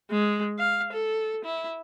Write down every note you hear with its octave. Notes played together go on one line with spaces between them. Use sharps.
G#3
F5
A4
E4